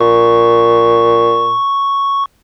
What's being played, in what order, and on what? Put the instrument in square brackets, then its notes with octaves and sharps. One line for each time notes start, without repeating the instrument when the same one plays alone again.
[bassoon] A#2 [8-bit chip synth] C#6